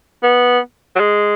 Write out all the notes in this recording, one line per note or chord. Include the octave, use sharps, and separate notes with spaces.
B3
F#3
G#3